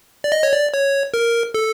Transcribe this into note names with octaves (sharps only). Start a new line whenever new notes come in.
D5
D#5
C#5
D5
C#5
A#4
A4